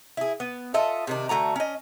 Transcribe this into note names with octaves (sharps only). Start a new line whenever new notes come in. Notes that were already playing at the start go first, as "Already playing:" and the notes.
E4 G#4
B3
F4 A4 D#5 E5
C3 D#3 D4
D3 A3 F#4 A#5
C#4 D#5